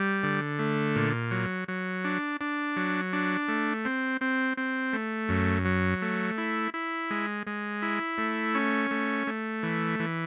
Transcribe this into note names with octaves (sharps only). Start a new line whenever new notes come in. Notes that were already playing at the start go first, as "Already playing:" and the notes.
Already playing: G3
D3
A3
A#2
F#3
F#3
D4
D4
F#3
D4
A3
C4
C4
C4
A3
F#2
F#3
A3
E4
E4
G#3
G#3
E4
A3
C#4
A3
A3
E3
E3